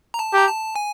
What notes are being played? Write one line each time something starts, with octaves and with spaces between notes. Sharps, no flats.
A#5
A5
G4 A#5
A5
G#5